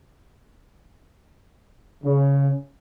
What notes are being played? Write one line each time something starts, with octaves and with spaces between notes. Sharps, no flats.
C#3